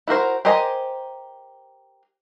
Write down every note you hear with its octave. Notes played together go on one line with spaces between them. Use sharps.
E4 F#4 A#4 C5
G4 A#4 C5 D#5 G#5